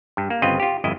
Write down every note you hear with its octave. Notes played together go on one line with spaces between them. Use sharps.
G2
A#3
G1 C#3 C4 F4 B4 D#5
F4 G4
G1 F2 E4 D#5